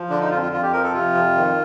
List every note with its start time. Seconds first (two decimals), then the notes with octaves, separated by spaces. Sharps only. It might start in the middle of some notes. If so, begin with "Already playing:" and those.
Already playing: F3
0.10 D3 D4
0.20 D#4
0.30 F2 F4
0.42 F4
0.52 F2 F4
0.62 G4
0.73 F3 A#4
0.83 A4
0.93 C3 F4
1.14 F2
1.36 D#3